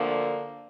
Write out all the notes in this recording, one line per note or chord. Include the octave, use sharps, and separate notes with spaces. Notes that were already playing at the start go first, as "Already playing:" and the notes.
Already playing: D2 D3 F3 A#3